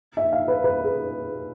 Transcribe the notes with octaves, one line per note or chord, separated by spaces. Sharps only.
E5
F5
B4
B4
G#4